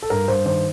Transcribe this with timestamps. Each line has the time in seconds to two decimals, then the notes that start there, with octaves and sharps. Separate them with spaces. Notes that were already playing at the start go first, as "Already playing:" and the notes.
0.02 A4
0.10 G2 A#4
0.28 G2 C5
0.45 D#3 C5